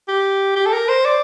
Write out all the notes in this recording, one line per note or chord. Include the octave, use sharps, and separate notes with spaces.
G4
G4
A4
A#4
C5
D5